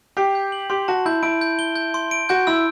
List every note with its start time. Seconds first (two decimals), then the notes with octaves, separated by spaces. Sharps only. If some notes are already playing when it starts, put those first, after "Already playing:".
0.17 G4 C7
0.35 G6
0.52 F#7
0.70 G4 C6
0.88 F#4 A5
1.06 E4 G6
1.23 E4 D7
1.41 G6
1.59 G7
1.76 G6
1.94 C6
2.11 D7
2.29 F#4 G6
2.47 E4 E6